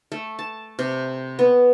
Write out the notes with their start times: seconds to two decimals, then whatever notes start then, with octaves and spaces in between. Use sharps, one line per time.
0.12 A3
0.39 A5
0.79 C3
1.39 B3